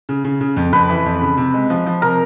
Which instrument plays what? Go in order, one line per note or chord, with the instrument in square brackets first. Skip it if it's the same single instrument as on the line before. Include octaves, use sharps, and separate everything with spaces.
[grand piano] C#3
C#3
C#3
F2
[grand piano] F2 [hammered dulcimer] B4
[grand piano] E3
F2
C#3
C3
G#3
F3
F3
[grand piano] C3 [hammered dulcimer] A#4